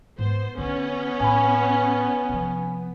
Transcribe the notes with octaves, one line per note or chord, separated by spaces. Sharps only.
G#2 B3 C5
D3 B3 C#4 D4 C#5
A2 G#5 B5
C3 F3